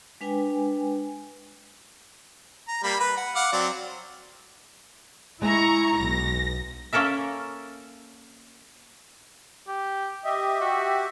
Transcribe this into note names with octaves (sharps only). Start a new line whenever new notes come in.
G#3 D4 B4 G5 G#5
A#5
G3 A#3 B5
B4
F#5
F5 F#5 D6
F#3 C4 D5
G#3 E4 A#5 C#6
B1 A#6
A#3 C#4 A4 A#4 E5
G4
G4 D#5 E5
F#4